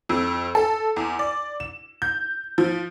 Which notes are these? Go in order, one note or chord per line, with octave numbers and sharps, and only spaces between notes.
F2
A4
E2
D5
E7
G6
F3